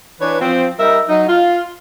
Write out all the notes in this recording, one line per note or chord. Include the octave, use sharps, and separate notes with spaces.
E3 D4 B4 C#5
F3 C4
G3 D#4 A#4 E5
F#3 D#4
F4